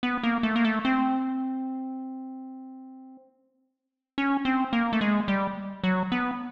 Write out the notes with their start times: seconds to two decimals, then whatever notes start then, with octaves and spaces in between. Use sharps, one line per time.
0.03 B3
0.23 A#3
0.43 A3
0.56 A#3
0.65 A3
0.85 C4
4.18 C#4
4.45 C4
4.73 A#3
4.93 A3
5.01 G#3
5.28 G3
5.84 F#3
6.12 B3